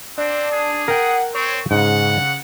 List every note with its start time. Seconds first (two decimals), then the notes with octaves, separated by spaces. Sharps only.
0.18 C4 D4
0.52 G#4
0.88 A#4 F#5 G5
1.34 C4 C#5
1.71 G#2 C#3 F#5